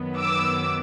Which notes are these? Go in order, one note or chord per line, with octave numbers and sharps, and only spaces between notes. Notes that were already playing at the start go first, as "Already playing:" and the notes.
Already playing: F#2 D#3 F#3 B3
D6 E6